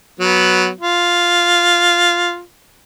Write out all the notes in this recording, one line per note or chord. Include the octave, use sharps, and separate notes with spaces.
F#3 B3
F4